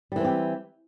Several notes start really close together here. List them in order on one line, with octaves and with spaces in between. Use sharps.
G3 E3 C4 G4